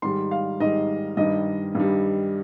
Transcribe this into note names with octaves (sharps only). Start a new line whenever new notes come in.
G#2 D#3 G3 C6
F5
G#2 D#3 G3 D#5
G2 D#3 G3 D#5
G2 D#3 G3